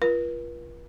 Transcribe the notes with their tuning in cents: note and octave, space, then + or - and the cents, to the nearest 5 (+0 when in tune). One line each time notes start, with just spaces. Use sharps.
F4 -25 B4 -45